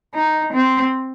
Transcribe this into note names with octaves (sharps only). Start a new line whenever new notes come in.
D#4
C4